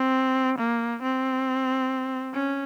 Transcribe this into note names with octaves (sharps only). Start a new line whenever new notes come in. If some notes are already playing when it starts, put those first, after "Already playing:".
Already playing: C4
A#3
C4
C#4